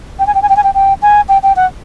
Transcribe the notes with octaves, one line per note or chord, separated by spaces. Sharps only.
G5
G#5
G5
G#5
G5
G#5
G5
G5
G#5
G5
G5
F#5